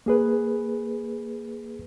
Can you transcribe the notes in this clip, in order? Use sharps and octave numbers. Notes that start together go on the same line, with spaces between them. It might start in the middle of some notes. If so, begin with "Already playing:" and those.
A#3 G#4 B4